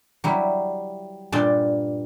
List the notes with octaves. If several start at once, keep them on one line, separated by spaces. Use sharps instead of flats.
F#3 G3 E4
G2 A#2 D5 C6